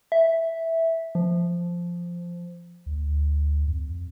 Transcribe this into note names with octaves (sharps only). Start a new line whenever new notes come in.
E5
F3
D2
F2